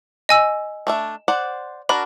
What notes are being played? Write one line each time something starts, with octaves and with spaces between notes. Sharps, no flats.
D#5 G#5 E6
A3 D4 E5
C5 D5 F#5
D4 F#4 A#4 B5